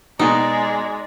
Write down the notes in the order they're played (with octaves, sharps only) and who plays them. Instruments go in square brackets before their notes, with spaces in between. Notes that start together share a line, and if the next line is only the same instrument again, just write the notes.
[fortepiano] B2 [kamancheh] G#3 D5 [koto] D#4